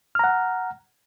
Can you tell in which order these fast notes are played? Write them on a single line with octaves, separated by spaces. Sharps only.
F6 A#5 F#5